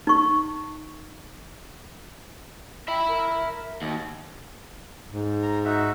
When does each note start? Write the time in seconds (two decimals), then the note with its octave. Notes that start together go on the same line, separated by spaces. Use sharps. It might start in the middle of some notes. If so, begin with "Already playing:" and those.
0.07 D#4 C#6
2.88 E5 G5 B5
3.08 A#4
3.82 D#2 F#4
5.12 G#2
5.42 A#5
5.65 D#4 F#4 E5